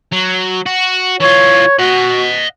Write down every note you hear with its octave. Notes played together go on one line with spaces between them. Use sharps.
F#3
F#4
E3 F4 C#5
F#4 D#5 F#5